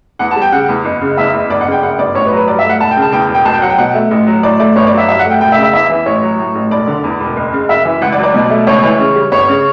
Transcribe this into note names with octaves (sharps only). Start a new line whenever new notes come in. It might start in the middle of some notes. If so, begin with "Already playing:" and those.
E2 F#5
A5
G3
G5
C#3 F#5
E2
F#1
C#3
E2 E5
F#1
G1 D5
F#5
C#3
G5
F#2 F#5
G1 D5
A1 C#5
B4
F#3
B4
G2 D5
E5
A3
F#5
E1 A5
G5
C#3
A5
E2 G5
E1
G5
B1 A5
G5
F#3 F#5
G5
B2 F#5
A3
A1
F#3
A2 D5
A3 D5
G1 C#5
D5
F#3
E5
G2 E5
F#5
A3
G5
E1 G5
E5
C#3
E5
E2 E5
E3
A1 C#5
F#3
A2
A1
E1 D5
D3
E2
E1
F#1
C#3
F#2 E5
E3
C#2 F#5
D5
F#3
D5
B2
A3
C#2 C#5
E3
C#3
G3
G1 C#5
C#3